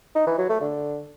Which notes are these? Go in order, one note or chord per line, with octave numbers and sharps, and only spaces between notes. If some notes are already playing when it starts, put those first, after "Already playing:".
D#4
E3
F#3
A3
D3